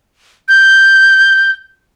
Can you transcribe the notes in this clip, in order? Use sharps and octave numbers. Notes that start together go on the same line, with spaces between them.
G6